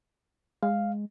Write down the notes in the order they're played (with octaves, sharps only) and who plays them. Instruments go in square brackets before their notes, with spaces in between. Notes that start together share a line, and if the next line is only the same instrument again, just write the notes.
[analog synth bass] G#3 [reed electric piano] F5